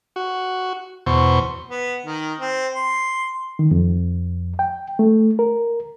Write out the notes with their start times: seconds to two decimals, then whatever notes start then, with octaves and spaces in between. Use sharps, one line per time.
0.16 F#4
1.06 E2 B2 C5 C#6
1.69 B3
2.05 D#3
2.40 C4
2.74 C6
3.59 D#3
3.71 F2
4.59 G5
4.99 A3
5.39 A#4